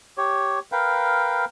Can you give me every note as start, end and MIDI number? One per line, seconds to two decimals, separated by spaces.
0.18 0.59 67
0.18 0.59 73
0.72 1.45 70
0.72 1.45 71
0.72 1.45 77
0.72 1.45 79